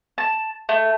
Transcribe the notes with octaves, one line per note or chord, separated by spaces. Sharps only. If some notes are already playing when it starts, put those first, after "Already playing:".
A5
A3